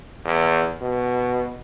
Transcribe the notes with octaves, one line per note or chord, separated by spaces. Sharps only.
E2
B2